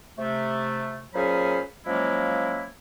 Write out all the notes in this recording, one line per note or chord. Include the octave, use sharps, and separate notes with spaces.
C3 A3
A#2 F#3 C#4 G#4 C5 B5
F3 F#3 G#3 A#3 C#4 E4